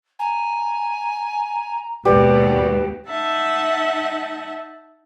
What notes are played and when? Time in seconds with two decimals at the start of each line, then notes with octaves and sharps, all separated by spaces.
0.19 G#5 A#5
2.05 D#2 G#2 B2 G4 B4 D5
3.06 D#4 D#5 E5 F#5 A5